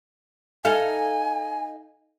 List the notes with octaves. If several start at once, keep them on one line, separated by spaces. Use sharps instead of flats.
D#4 A4 F5 G#5